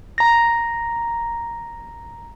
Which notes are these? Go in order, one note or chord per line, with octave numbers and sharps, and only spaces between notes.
A#5 A#6